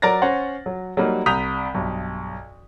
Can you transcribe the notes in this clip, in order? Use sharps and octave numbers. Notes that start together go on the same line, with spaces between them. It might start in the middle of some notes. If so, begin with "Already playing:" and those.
F#3 A#4 D5 A6 A#6
C#4 C5 F#5
F#3
F#3 G3 A#3 D#4
C2 A#5 D#6 G6 B6 F7
B1 G2